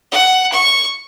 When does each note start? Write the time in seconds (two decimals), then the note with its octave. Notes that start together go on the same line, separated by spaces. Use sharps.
0.11 F#5
0.52 C#6